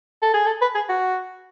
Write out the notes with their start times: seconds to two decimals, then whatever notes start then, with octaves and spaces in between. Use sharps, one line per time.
0.22 A4
0.34 G#4
0.46 A4
0.61 B4
0.75 G#4
0.89 F#4